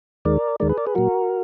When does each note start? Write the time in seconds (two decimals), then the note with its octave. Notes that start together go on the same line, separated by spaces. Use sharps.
0.25 D#2 D#3 G#3 A#4 D5
0.60 D#2 D#3 G#3 A#4 D5
0.69 G#4 B4
0.78 A#4 D5
0.87 G#4 B4
0.95 A#2 F#3 F#4 A#4